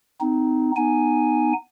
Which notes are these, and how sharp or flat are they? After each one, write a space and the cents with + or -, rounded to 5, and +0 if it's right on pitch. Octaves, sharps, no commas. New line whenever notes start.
C4 -30 D#4 +0
B3 +0 D#4 -15 G#5 +0